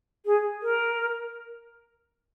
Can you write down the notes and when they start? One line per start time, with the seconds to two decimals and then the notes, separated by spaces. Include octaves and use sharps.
0.26 G#4
0.63 A#4